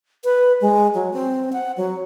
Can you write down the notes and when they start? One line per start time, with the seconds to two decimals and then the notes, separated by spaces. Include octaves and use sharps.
0.24 B4
0.61 G#3
0.94 F#3
1.13 C4
1.53 F#5
1.77 F#3